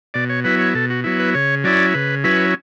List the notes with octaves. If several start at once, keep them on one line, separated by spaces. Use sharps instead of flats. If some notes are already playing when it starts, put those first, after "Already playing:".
B2 D5
C#5
F#3 B3 E4 B4
C#5
B2 A4
F#4
F#3 B3 E4
B4
C#3 C#5
F#3 C#4 E4 D5
C#3 B4
F#3 C#4 E4 B4